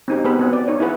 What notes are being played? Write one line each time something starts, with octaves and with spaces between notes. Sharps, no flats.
C4 D#4 G4
B3 G4 G#4 B4 C5 B5
B3 C4 F#5
D5
D#4 C#5
E4 G#4 B4 F#5